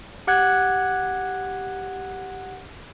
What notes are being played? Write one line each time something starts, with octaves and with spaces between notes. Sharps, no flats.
G4 F#5 F#6 G#6